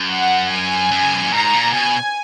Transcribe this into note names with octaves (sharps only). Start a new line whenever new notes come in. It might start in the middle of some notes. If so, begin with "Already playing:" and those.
Already playing: F#2
F#5
G#5
F#2
C#3
B2
A#2
G#2 A#5
A#2
B2 G#5